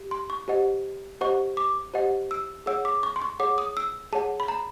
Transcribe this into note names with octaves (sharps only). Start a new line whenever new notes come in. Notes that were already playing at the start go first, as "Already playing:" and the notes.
Already playing: G4
C6
C#6
G4 C5 D#5 F#5
G4 C5 D#5 F#5 C#6
D6
G4 C5 D#5 F#5
E6
G#4 C#5 F#5 E6
D6
C#6
C6
C#6
G#4 C#5 F#5 D6
D#6
E6
G#4 C#5 F#5 A5
B5
A#5